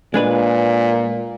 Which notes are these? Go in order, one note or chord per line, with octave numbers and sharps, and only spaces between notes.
A#2 G#3 D4 B4